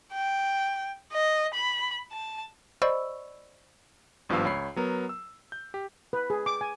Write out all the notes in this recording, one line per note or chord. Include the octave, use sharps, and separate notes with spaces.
G5
D#5
B5
A5
C5 D5 D#5 B5 C#6 E6
G#1 G2 F3 B3 F5 E6
C#2 C#5 B5 C7
F#3 B3 A#4
E6
G6
G4
B4
G#4
D6
G#5